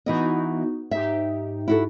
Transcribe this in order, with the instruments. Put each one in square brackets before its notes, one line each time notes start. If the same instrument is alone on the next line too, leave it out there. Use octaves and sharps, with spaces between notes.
[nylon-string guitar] E3 E4 D#5 [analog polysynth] B3 D#4 F#4
[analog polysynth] G#2 D#4 G4 [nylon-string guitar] E5
[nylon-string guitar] E4 F#4 A4